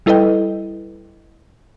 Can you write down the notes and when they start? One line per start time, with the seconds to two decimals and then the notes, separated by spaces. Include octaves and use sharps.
0.06 G3 E4 A4 B4 D#5 G5